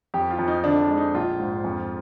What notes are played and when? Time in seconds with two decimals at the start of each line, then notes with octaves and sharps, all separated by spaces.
0.14 F2 G4
0.31 F4
0.39 F2
0.48 D#4
0.64 D3 D4
0.81 D4
0.89 G#3
0.98 D#4
1.14 A#1 F4
1.39 G#2
1.64 F2